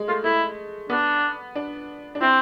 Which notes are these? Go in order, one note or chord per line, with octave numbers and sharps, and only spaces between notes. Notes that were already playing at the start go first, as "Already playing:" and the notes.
Already playing: G#3
A3 F4
A3 E4
B3 D4
D4
D4
C4 E4